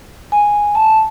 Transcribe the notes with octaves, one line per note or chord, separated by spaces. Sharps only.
G#5
A5